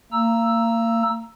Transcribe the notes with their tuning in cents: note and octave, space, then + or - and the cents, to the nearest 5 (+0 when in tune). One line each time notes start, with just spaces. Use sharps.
A#3 -35 A#5 +0 E6 +0